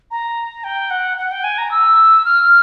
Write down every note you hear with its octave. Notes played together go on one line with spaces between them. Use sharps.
A#5
G5
F#5
F#5
G5
G#5
A#5
E6
F6